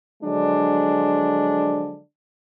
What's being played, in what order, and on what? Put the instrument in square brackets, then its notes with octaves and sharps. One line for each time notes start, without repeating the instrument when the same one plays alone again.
[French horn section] D3 F3 F#3 G#3 D4